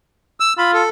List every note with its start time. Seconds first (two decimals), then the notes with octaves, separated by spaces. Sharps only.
0.40 E6
0.58 F4 B5
0.74 A4